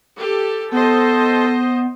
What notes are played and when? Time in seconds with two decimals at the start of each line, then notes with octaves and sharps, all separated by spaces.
0.16 G4 A4
0.72 B3 A4 C5 D#5